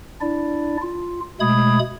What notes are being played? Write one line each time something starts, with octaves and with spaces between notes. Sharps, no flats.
D4 E4 D5
F4
B2 G#3 A3 B5 D#6 G#6